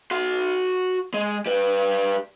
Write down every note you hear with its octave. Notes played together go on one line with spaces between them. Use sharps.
F#4 C6
G#3
G3 B4